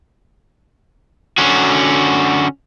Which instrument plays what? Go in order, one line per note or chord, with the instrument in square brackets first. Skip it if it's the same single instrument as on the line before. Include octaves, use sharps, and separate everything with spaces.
[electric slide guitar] D3 C#4 F#4